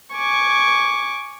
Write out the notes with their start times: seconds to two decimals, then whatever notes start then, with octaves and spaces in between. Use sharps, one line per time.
0.15 G#5 C#6 D6